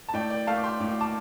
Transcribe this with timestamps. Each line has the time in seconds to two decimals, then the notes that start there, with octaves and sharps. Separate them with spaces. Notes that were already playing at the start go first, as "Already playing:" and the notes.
0.09 A5
0.14 A2 D5 G5
0.30 D5 G5
0.47 A3 F5 A5
0.58 D6
0.63 G5 C6
0.80 A2 D6
1.01 A5 D6